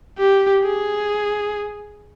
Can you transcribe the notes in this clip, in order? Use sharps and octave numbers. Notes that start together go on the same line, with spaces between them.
G4
G#4